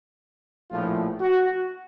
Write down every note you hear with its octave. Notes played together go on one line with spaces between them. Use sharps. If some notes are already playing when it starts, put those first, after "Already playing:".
A#1 A2 F3 A3 F4
F#4